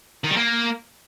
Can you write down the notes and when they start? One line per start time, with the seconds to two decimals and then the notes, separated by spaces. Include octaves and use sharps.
0.24 D#3
0.30 G3
0.37 A#3